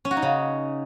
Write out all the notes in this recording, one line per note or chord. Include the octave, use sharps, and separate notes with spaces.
C#4
F#4
D#4
C#3